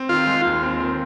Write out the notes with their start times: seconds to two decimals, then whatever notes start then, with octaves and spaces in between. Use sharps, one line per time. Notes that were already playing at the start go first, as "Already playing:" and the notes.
Already playing: C4
0.09 D#3 F4
0.27 G#3
0.45 D#2
0.63 C4
0.80 D#3